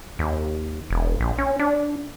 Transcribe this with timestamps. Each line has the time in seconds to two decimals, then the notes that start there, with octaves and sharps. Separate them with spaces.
0.19 D#2
0.90 E1
1.20 A#1
1.38 C#4
1.59 D4